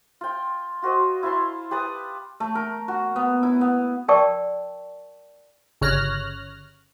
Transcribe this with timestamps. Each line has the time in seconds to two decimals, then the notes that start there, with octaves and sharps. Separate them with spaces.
0.21 F4 G5
0.82 F4 F#4 C5 D#5
1.23 E4 F4 A5 C6
1.71 G4 B4 A5 D#6
2.40 A3
2.55 A#4
2.88 F#4
3.16 B3
3.43 E4
3.61 B3
4.08 A#4 D5 G5 A5 C#6
5.81 G1 C#3 C#5 F6 F#6 A#6